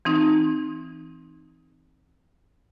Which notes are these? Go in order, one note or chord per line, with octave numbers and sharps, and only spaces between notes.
E3 C4 D#4